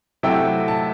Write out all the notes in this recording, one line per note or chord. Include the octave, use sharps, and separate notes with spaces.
C3 F#3 A3 E4 G5
A5